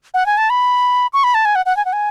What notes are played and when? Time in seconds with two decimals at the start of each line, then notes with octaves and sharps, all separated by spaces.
0.14 F#5
0.26 G#5
0.38 A5
0.50 B5
1.13 C#6
1.24 B5
1.34 A5
1.45 G#5
1.55 F#5
1.66 F#5
1.77 G#5
1.85 F#5
1.93 G#5